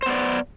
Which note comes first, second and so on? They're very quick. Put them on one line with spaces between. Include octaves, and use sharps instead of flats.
C5 B3 D5